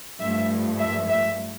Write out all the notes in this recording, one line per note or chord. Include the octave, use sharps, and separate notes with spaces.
G2 F3 A3 E5
E5
E5